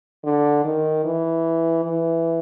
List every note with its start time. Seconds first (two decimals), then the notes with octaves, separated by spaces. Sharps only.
0.24 D3
0.64 D#3
1.05 E3
1.85 E3